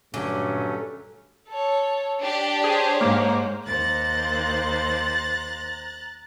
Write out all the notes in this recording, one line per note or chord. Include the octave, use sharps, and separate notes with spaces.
G2 A#2 D3 F#3 A3 C#4
A4 C#5
D4 G4 D5
G#4 C5 C#5
G#2 A#3
D#2 C5 A#5 F#6 A6